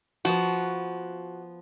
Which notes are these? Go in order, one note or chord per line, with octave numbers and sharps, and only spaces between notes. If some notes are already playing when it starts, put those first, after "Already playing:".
F3 B3 F#4